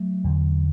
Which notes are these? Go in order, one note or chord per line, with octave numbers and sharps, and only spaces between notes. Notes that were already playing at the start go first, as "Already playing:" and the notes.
Already playing: F#3 A3
E2 D3